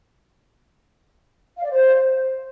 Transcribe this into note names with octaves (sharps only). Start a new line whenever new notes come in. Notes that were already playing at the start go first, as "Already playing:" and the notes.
F5
D5
C5